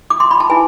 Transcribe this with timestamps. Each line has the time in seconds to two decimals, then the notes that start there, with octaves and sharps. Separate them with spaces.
0.10 D6
0.20 C6
0.31 B5
0.40 A5
0.50 E4 B4 G#5